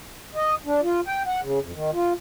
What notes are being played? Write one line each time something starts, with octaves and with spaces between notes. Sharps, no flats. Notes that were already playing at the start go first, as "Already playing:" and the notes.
D#5
D4
F4
G5
F#5
C#3
F2
D#3
F4